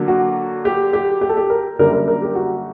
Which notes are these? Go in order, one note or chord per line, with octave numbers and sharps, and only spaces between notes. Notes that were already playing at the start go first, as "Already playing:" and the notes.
Already playing: D3 F#3 A#3
F#4
G4
G4
G4
A4
G4
A#4
F#2 D3 G3 A#3 A#4
A#4
A#4
G4
F#4